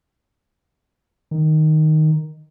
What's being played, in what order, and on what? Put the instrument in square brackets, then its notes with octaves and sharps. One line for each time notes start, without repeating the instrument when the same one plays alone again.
[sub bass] D#3